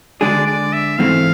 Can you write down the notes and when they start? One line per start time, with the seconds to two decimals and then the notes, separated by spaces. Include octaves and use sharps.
0.21 D3 G#3 D4 G#4 D5
0.47 D5
0.73 E5
0.99 G#2 E3 A3 C4 F5